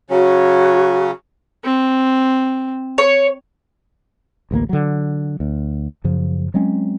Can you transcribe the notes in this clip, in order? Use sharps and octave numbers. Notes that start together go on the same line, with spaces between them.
C#3 F#3 C#4 F#4
C4
C#5
A1 D2 F#3 A#3
D3 F#3
D2
F#2 C#3 F3
F#3 G#3 C4 C#4